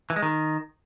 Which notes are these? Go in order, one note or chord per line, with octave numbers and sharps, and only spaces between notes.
E3
G#3
D#3